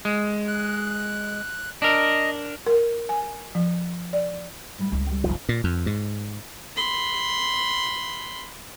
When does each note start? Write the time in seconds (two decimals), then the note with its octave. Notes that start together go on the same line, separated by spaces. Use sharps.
0.05 G#3
0.48 F#6
1.82 D4 A#4 D#5
2.67 A#4
3.09 G#5
3.55 F3
4.13 D5
4.78 A2 G3
4.92 C#2 E4
5.07 G3 G5
5.24 F#1 G#2 F3
5.49 A#2
5.64 F2
5.86 G#2
6.77 B5 C6